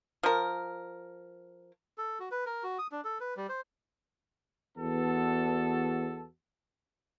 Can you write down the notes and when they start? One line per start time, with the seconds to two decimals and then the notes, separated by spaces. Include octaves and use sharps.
0.23 F3 A#4
1.98 A4
2.20 F#4
2.31 B4
2.46 A#4
2.63 F#4
2.79 D#6
2.92 D4
3.05 A4
3.20 B4
3.37 G3
3.49 C5
4.78 E2 B3 F#4 A4